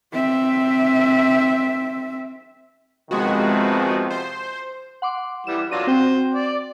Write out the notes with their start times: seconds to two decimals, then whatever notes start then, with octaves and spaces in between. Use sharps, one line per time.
0.13 C4 E5
3.11 C3 D#3 F3 G#3 B3 F#4
4.11 C5
5.02 F#5 C6 D6
5.47 E3 G3 E7
5.71 F#3 D4 F4 A#6 D#7
5.87 C4 F#4 C5 G5
6.34 D5